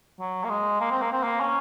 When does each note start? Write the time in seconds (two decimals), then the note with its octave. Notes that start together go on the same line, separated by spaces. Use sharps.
0.20 F#3
0.44 A#3
0.49 G#3
0.81 A#3
0.91 C4
1.02 A#3
1.12 C4
1.23 A#3
1.40 C#4